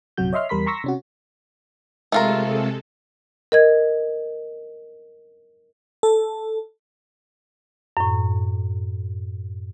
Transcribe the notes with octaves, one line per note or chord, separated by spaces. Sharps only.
A#1 F#2 C3 F#3 F#4 G6
C#5 D#5 E5 C6 F6
E2 G3 A#4 B5 C6 B6
A#5 C6 C#6 E6 A#6 B6
C3 C#4 F#4
C3 G#3 A3 F4 A4 A#4
A#4 D#5 G#6
A4
F#2 A2